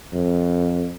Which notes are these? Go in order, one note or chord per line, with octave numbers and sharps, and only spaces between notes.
F2